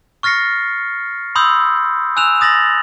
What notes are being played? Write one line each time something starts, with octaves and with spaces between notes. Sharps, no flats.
C#6 F6 A6 A#6 C7 C#7
B5 C6 D#6 E6 G6
G#5 E6 F#6 E7 F7
D#6 A6 A#6 F#7